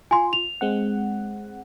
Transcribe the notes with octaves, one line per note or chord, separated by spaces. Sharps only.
F4 G#5 C6
F7
G#3 C4 F#5